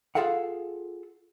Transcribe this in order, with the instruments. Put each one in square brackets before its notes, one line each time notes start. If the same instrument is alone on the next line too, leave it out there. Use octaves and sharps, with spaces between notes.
[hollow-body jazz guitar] F4 G#4 A4 F5 F#5